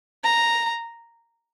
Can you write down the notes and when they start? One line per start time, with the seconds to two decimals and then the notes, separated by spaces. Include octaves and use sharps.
0.24 A#5